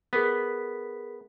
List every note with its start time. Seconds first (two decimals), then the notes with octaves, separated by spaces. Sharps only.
0.13 B3 G#4 A#4 B6